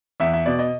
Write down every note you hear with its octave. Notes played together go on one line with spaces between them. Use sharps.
E2 E5
E5
B2 D5
D#5